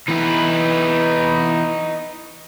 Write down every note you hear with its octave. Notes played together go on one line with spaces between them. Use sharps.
E3 B3 D#4 E4 B4